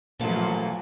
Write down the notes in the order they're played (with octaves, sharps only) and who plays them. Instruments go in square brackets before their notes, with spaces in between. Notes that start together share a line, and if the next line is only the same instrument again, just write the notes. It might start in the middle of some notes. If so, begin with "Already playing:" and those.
[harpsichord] A1 A5 [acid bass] A#2 [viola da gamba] F3 F#3